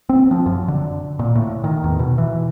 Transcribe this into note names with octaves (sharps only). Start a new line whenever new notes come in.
C4
F3
F#2
D3
A#2
A2
D#3
E2
B2
E3